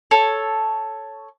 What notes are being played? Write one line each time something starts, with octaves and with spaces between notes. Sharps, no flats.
A4 C#5